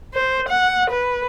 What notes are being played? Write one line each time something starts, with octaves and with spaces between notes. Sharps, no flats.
C5
F#5
B4